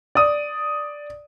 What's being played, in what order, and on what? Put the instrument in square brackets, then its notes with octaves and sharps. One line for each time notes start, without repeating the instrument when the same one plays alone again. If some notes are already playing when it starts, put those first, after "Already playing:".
[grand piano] D5 D#6